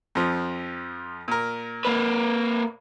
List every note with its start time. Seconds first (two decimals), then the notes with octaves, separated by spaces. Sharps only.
0.15 F2 F3
1.28 A#2 A#4
1.85 A#3 B4